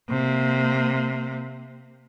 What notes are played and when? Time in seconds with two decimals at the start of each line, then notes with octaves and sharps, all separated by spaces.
0.10 C3 A#3